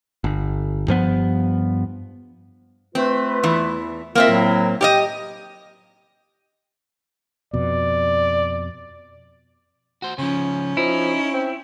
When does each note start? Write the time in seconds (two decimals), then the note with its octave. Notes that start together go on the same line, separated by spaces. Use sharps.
0.24 G1
0.88 G2 F3 B3
2.95 A3 C4 F4 B4
3.43 E2 E3
4.15 A#3 C4 F4 A#4 E5
4.30 A2 F#3
4.81 G4 D5 D#5 G5
7.54 F2 B2 D5
10.02 F#4 C5
10.18 C#3 F3 C#4
10.77 F3 D#4 E4
11.33 C4